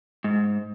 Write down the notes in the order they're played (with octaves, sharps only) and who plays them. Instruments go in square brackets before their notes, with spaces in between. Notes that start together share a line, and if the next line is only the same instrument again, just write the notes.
[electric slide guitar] G#2